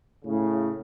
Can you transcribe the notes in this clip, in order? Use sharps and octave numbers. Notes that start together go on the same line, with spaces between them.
A2 C#3